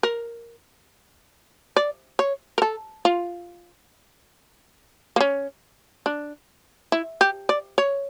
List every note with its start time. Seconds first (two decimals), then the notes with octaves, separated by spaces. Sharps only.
0.03 A#4
1.76 D5
2.19 C#5
2.58 A#4
2.62 A4
3.05 F4
5.16 A#3
5.20 C#4
6.06 D4
6.92 E4
7.21 G4
7.49 D5
7.78 C#5